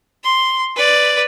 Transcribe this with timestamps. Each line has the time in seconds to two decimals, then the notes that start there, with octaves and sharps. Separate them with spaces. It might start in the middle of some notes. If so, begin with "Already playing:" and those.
0.24 C6
0.76 B4 D5